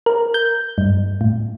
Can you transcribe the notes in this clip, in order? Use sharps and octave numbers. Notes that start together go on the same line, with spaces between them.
A#4
G6
G2
A2